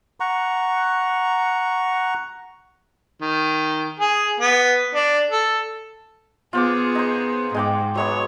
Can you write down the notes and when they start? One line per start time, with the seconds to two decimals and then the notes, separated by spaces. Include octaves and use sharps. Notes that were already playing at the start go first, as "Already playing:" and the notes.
0.20 F#5 A#5 C#6
3.21 D#3
4.00 G#4
4.40 B3
4.95 D4
5.30 A4
6.53 B3 F4 G#4 C5 D6
6.95 D#4 C5
7.54 G#2 G#3 G5 D6
7.95 F#3 G#3 B3 C#5